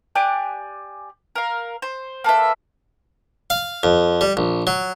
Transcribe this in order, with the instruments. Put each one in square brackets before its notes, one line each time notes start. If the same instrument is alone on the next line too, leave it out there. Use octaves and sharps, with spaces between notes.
[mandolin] G4 D5 G#5 F#6
A#4 F5
C5
A#3 A4 B4 E5
[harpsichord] F5
F2
G3
A#1
F#3